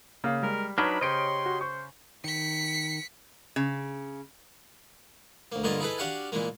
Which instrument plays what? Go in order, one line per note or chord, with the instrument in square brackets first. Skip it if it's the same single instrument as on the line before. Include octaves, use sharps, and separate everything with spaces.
[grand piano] C#3 F5 [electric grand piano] A#3
[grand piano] G3 [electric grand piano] G#3 [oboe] A#4
[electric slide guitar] F#3 D4 D#4 [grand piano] B4 C#5 [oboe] B5 [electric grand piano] F6 F#6
[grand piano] C#3 [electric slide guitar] G4 C#5 D#5 [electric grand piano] C5 D7 [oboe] C6
[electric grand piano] F#4
[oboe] C5 [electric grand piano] C#6
[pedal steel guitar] D#3 [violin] B6 C#7
[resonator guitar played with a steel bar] C#3
[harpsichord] D2 A#3
G2 D3 A#3 F4 D#5 G#5
D#4 E4 G#4 A4 B4
D4 F#4 G4 F5 F#5 G#5
A#2 E3 G#3 A#3